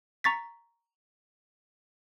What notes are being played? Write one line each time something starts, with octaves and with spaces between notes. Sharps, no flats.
A#5 C#6 A6 B6